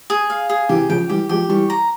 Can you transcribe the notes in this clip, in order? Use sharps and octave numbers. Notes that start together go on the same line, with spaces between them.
G#4
F5
G#4
C3 E3 G4
C#3 F3 G5
E3 G3 G4
F3 G#3 G4
E3 G3 C#6
A#5